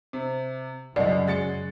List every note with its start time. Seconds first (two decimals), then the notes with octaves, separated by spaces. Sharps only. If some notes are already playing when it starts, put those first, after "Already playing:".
0.13 C3
0.96 C2 F#2 C#3 F#3 D5 D#5
1.27 G#3 A6 C#7